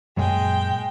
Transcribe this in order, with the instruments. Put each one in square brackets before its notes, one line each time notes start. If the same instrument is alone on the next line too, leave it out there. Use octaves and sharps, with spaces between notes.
[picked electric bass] F#2 A#2 F#3 [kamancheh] G#3 G5